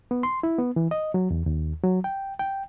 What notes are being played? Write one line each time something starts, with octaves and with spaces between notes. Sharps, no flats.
B3
C6
E4
B3
E3
D#5
F#3
E2
D#2
F#3
G5
G5